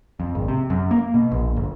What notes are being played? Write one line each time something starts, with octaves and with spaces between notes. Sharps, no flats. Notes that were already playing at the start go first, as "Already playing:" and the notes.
F2
G#1
C3
F#2
A#3
B2
A#1
G1